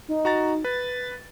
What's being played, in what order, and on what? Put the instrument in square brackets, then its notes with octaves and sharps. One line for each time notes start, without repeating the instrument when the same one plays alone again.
[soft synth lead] D#4
[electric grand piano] F#4 A#5 A6
[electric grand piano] B4 [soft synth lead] A6